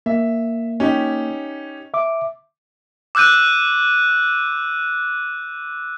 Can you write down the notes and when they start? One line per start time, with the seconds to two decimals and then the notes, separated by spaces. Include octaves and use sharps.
0.06 A#3 E5
0.80 C#4 D#4 G4
1.94 E5 D6
3.15 D6 E6 F#6 G6 D#7